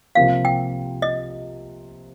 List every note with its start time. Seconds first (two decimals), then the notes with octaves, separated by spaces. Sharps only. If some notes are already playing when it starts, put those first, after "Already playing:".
0.15 C3 F3 A#3 F5
0.45 G5
1.02 D#5